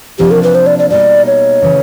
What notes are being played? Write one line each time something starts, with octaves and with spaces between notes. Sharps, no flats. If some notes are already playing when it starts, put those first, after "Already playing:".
C3 F3 A#3 D4 G4
A#4
B4
C5
D5
D5
B2 G3 A#3 D#4 D5
C#5
C#3 E3 A3 C#4